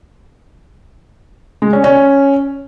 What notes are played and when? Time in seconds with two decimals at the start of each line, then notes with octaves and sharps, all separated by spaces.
1.62 G#3
1.73 C#4
1.84 C#4